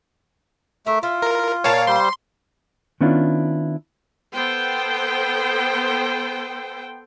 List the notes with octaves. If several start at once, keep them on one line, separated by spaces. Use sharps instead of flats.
A3 A#4 E5
E4 F4
A#4
A#2 A#3 C#5 F5 A5
G3 C5 C6
D#3 B3 C#4 D4 E4 F4
B3 A4 C5 G5